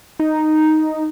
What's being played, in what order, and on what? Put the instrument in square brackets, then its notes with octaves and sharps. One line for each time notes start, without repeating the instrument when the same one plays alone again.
[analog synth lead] D#4